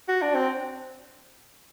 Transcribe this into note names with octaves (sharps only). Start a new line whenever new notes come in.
F#4
D4
C4